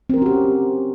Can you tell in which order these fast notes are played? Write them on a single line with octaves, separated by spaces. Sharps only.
C4 A#4 C#4 F#4 G4